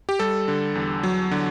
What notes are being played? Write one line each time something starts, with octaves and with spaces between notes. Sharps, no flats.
G4
G3 A4
D3
E2
F#3
D3